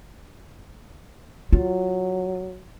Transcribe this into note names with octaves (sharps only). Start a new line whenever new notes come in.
F#3 F4